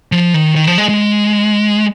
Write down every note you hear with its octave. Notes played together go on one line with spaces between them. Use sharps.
F3
D#3
D#3
F3
G#3
G#3